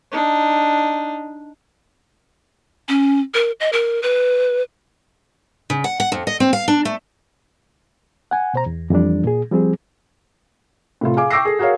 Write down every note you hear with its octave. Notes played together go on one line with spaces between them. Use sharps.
D4 D#4
C#4
A#4
D#5
A#4
B4
C#3
F#5
F#5
F2
D#5
C4
F5
D4
A3
F#5 G#5
B2 C5 A#5
E2
F2 E3 G3 D4
A#2 G#4
F3 G3 C4 G#4
A2 C3 F4
G#4 F5 G#5 D6
G5 C#6 D6 E6 A#6 C7
G#4 A4
F#4 G#4 A#4 C#5 F5